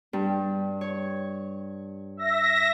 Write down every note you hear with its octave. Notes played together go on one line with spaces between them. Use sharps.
G2
C#5
E5 A#6